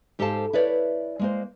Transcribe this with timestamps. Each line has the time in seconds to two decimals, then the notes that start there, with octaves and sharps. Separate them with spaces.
0.19 G#2 G4 A4 C5 F5 A5
0.53 E4 B4 C#5 D5
1.19 G#3 A#3 C5